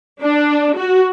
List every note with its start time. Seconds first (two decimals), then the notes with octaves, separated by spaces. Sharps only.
0.22 D4
0.77 F#4